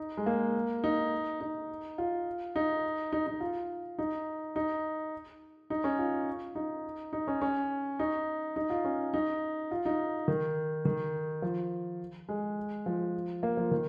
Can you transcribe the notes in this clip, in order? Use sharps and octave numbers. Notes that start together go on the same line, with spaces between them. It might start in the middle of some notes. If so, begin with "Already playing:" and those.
Already playing: D#4
G#3
A#3
D#4
D#4
F4
D#4
D#4
D#4
F4
D#4
D#4
D#4
C#4
F4
D#4
D#4
C#4
C#4
D#4
D#4
F4
C#4
D#4
F4
D#4
D#3
D#3
F3
G#3
F3
A#3
F3
D#3